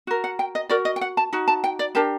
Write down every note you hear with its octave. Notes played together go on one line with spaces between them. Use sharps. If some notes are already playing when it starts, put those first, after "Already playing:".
F#4 A#4
F#5
G5
D#5
F#4 A#4 D5
D#5
G5
F#5
A5
D#4 F#4
A5
G5
D5
D4 G4 A#4 A5